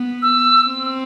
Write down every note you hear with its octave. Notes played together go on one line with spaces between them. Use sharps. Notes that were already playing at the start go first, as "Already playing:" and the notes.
Already playing: B3
E6
C4